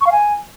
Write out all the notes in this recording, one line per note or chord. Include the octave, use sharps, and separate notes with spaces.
C#6
F5
G#5